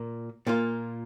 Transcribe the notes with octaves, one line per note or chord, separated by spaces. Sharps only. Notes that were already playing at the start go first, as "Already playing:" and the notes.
Already playing: A#2 A#3 F4
A#2 A#3 F4